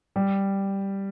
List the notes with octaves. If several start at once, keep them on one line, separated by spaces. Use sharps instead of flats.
G3